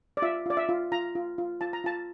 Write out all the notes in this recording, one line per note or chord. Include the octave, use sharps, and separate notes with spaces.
D5
F4 E5
F4 D5
E5
F4
F4 A#5
F4
F4
F4 A5
A#5
F4 A5